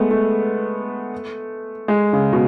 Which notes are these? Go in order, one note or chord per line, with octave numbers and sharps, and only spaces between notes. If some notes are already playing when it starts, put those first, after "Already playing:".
Already playing: G#3 A3 B3
A3
G#3
C#3
B2